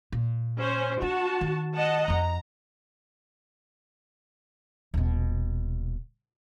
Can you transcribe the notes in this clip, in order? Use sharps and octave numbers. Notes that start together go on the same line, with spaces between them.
A#2
C#4 C5
D4 F#4 A5
D#3
D#5 F#5 A5
F2 F3 A#5
D#1 B2